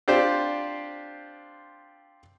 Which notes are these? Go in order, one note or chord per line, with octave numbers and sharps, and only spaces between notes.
C4 D4 F4 G4 C5